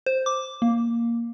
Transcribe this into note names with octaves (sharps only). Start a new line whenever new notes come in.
C5
D6
A#3